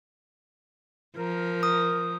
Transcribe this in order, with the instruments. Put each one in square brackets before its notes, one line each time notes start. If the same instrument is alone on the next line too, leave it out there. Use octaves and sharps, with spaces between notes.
[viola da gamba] F3 [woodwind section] A#4
[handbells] D#6